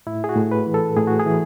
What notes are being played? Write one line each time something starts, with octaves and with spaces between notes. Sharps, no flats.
A2 E4
G#4
F#4
A2
B4
E3
A4
A2 G#4
F#4
G#4
E3